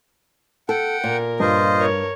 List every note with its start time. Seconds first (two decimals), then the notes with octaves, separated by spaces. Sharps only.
0.69 A4 F#5 G5
1.04 A#2 A#4
1.40 G2 F4 C5 D#5
1.78 A#4 C#5